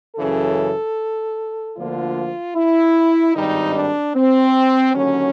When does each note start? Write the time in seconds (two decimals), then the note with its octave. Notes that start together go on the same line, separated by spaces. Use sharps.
0.16 F#2 C#3 E3 A4
1.76 D2 D3 F3 A#3 F4
2.55 E4
3.35 G#1 G2 D#3 G3 D#4
3.75 D4
4.15 C4
4.94 D#2 D3 F#3 C#4